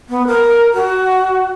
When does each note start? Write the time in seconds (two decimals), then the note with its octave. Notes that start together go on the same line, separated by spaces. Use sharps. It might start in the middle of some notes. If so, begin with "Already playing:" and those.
0.09 B3
0.27 A#4
0.74 F#4